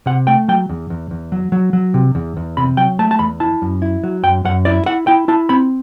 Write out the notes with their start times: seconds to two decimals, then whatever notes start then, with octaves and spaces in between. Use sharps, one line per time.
0.06 C3 F#5
0.27 A3 G5
0.48 F#3 G5
0.69 E2
0.90 E2
1.11 E2
1.32 F#3
1.52 F#3
1.73 F#3
1.94 C3
2.15 E2
2.37 E2
2.57 C3 B5
2.77 F#3 G5
2.99 A3 A5
3.11 A5
3.19 E2 B5
3.40 E4 A5
3.62 F#2
3.82 E4
4.04 F#3
4.23 F#2 G5
4.45 F#2 F#5
4.65 E4 D5
4.86 E4 F#5
5.07 E4 G5
5.28 E4 A5
5.49 C4 B5